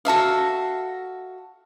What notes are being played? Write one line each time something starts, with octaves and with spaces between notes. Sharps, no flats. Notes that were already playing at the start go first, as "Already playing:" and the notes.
F#4 A4 E5 F5